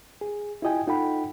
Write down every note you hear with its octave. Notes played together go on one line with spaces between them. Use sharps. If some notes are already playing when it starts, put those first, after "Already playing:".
G#4
E4 F4 G4 D#5 G5 G#5
D#4 F4 A4 F#5 G5 B5